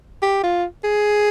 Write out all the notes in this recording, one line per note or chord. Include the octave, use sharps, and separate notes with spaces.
G4
F4
G#4